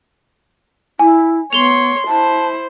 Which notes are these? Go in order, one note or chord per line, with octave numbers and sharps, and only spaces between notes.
E4 G#5
B3 C#5 C6 F7 G7
E4 C5 A5